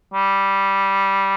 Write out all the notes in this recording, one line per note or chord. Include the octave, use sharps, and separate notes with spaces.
G3